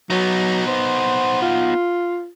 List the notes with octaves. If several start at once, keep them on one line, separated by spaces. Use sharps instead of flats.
F#3 B3 D#4
C5
F4